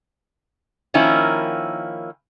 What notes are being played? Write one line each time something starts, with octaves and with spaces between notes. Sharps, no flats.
D#3 F3 A#3 C#4 E4